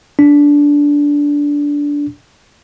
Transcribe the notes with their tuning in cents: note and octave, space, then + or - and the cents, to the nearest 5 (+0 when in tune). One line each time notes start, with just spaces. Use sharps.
D4 -15